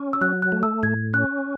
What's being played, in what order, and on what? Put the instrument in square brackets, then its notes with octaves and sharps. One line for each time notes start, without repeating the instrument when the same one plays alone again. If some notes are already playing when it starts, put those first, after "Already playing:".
Already playing: [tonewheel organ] C#4
[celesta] E6
[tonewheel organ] F#3 [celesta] F#6
[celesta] F#6
[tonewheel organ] A3
[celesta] E6
[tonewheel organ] A2 [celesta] G#6
[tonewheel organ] C#4 [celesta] F#6